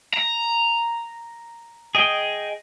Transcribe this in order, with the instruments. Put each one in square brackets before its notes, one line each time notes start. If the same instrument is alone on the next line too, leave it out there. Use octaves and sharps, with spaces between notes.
[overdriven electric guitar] A#5
[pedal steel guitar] G#4 D#5 G5